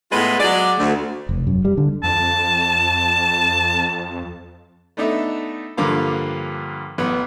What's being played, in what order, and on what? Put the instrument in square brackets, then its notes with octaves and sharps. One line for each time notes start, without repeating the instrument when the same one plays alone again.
[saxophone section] A2 G#3 B3 F4 B4
F#3 G#3 D5
D2
[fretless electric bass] F1
F#2
G3
D3
[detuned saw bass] F2 [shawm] A5
[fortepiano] A3 B3 D4 D#4 A4 E5
G2 D3 F3 A#3 F5 D6
A1 B3 B4